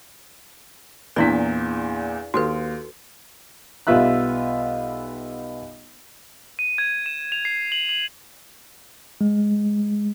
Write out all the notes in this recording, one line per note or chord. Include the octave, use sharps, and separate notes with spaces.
E2 A#2 D4 E4 D5 B6
D#2 F#4 A4 B4
B1 G3 B3 F4 E5 F#6
D#7
G#6
E7
F7
C7
F#7
F#7
G#3